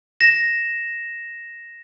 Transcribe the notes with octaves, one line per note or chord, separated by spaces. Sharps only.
A#6 E7